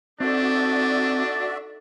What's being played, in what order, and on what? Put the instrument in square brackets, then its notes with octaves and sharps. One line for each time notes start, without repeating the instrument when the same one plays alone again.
[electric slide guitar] C4 [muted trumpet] D4 [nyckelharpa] D#4 A4 [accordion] F#4 D5 E5